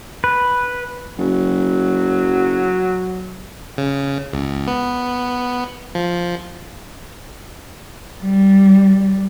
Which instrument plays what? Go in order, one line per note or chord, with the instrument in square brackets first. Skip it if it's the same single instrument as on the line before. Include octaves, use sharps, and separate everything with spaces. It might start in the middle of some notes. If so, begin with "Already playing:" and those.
[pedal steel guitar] B4
[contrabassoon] F#1 [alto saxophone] F#3
[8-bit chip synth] C#3
C#2
B3
F3
[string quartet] G3